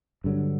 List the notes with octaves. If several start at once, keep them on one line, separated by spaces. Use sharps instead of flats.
G2 D3 F#3